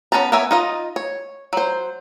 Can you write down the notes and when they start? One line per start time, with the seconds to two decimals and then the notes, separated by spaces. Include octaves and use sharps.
0.12 B3 C#4 C5 A5 A#5
0.32 B3 A#4 C#5 E5 G#5
0.51 D#4 F4 D#5
0.96 C#5
1.53 F#3 C5